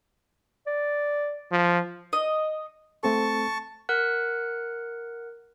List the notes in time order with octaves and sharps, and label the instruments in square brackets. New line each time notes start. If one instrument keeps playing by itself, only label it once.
[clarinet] D5
[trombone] F3
[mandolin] D#5
[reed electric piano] A3 C4 A4 [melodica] A5 C#6
[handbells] A#4 F#5 F#6